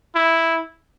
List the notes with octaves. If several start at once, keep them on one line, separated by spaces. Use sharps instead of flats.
E4